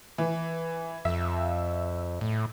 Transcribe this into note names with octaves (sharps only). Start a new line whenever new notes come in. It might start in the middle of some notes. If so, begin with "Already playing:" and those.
E3
F2 E5
A2